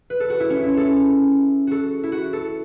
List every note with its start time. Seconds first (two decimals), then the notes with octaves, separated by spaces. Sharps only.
0.10 B4
0.20 A4
0.30 F#4
0.40 E4
0.50 C#4
0.64 E4
0.77 A4
1.67 F#4 A4
2.03 E4
2.12 F#4
2.33 A4